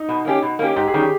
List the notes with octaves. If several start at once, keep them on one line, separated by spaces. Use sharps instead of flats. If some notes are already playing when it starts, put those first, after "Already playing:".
Already playing: D#4
B2
A#3 C#4 G4
B2
A#3 C#4 G4
G#2 G4
G#4
D#3 G3 C#4
G4